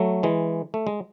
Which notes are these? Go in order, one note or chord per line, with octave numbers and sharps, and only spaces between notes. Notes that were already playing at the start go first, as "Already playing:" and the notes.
Already playing: F#3 A3
E3 G#3
A3
G#3